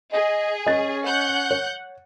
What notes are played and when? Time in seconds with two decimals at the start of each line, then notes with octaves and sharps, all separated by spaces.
0.12 G#4 D#5
0.66 C#4 D#5 A6
1.05 F#5 F#6 G6
1.51 C#5